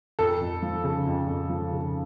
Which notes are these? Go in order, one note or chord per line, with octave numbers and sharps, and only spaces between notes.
F2 A4
F2
F3
C#3
F2
F2
F3
C#3